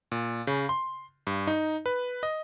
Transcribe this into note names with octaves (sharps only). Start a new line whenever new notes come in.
A#2
C#3
C6
G2
D#4
B4
D#5